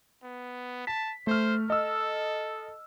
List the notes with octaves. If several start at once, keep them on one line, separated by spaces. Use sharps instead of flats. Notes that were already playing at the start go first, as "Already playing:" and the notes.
B3
A5 B6
A3 C5 F6
A4 D#5 E6